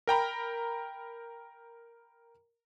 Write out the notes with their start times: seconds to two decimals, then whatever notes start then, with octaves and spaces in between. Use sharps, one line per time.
0.07 A#4 G5 A#5 B5